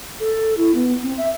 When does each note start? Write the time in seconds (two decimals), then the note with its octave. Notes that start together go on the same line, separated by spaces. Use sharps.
0.20 A4
0.57 E4
0.74 B3
1.03 C4
1.18 E5